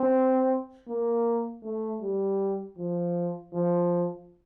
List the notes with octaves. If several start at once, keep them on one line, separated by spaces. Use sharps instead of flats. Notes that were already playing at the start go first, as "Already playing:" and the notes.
Already playing: C4
A#3
A3
G3
F3
F3